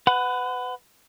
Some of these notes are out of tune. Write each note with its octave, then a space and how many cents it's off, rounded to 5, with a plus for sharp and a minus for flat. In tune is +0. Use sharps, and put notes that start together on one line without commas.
B4 +25 F#5 +0